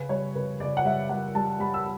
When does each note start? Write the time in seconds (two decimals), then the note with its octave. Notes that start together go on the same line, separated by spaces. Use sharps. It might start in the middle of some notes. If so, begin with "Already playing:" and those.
Already playing: C#3 B4
0.09 G3 C#5
0.35 C#3 B4
0.60 C#3 D5
0.77 F#5
0.85 G3 E5
1.09 G3 F#5
1.35 G3 A5
1.59 G3 B5
1.74 E6